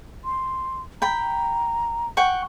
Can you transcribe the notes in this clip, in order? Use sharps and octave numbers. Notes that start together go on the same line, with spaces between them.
C6
G5 A#5 B5
F#5 G5 C#6